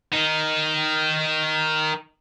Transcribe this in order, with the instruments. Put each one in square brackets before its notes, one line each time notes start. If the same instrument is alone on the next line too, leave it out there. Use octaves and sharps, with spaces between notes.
[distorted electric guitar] D#3 D#4